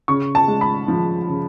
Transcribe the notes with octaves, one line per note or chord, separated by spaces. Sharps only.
C#3 C#6
A5
G#3
B5
F3
C#3